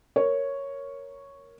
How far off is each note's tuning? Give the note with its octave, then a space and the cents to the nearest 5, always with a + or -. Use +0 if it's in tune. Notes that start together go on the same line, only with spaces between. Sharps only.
A#4 +0 C#5 +0